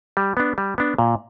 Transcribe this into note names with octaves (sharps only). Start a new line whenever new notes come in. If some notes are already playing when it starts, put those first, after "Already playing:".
G3
B3 D4
G3
B3 D4
A#2